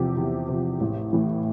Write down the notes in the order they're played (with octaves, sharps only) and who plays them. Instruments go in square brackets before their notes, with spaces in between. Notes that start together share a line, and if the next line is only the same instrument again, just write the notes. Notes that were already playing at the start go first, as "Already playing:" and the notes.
Already playing: [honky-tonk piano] E2 C3 F3 G4
E2
C3 F3
A1
A2 E3